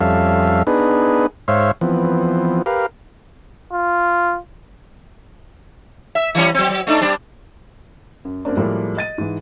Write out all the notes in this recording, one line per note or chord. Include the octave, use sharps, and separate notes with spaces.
F2 G3 C#4 A4 E5 F5
B3 D4 D#4 G#4 B4
G#2 C5 C#5 E5 F5
E3 F3 B3 C4
G4 A#4 B4 F5
F4
E5
E3 G3 C#4
F#3 C4
F#3
A3 D4 D#4
G3 C4 D4
F#2
F#2 A#3 C4 D4
A2 F3 G3 G#3 A#3
D#5 A6 D#7
G#2 E3